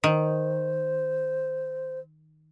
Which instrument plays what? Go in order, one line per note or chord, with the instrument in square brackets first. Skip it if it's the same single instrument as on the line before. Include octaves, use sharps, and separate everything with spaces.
[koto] D#3 [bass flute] C5